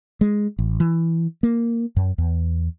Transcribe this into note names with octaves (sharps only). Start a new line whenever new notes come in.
G#3
A1
E3
A#3
F#2
E2